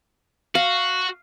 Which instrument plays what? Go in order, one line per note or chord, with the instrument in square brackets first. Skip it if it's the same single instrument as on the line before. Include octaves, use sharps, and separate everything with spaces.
[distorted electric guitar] F#4 [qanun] F5